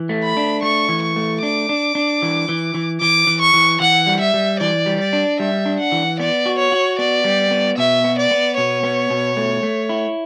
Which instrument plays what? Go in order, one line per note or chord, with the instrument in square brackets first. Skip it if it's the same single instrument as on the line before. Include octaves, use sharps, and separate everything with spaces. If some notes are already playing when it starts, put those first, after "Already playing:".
Already playing: [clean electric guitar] E3
A3
[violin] B5
[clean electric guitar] D4
[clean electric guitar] A3 [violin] C#6
[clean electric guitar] E3
[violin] C#6
[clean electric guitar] A3
[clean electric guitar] D4 [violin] D6
[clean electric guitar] D4
D4
E3
E3
E3
[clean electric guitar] E3 [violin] D6
[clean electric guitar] E3
[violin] C#6
[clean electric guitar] E3
[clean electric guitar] E3 [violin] F#5
[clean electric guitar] G3
[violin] E5
[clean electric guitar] G3
[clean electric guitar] E3 [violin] D5
[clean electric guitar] G3
[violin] D5
[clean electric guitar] D4
[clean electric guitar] G3 [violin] E5
[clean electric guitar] D4
[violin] F#5
[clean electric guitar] E3
[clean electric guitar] B3 [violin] D5
[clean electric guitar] F#4
[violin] C#5
[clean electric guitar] F#4
[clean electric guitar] B3 [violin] D5
[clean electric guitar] G3
B3
[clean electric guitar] B2 [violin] E5
[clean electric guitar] B3
[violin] D5
[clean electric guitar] B3
[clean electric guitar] B2 [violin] C#5
[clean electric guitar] B3
B2
A3
A3
E4